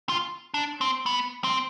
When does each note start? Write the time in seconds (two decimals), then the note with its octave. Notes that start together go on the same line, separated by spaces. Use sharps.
0.09 F4
0.54 D4
0.81 C4
1.06 B3
1.44 C4